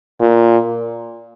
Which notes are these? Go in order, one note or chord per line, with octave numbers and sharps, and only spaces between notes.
A#2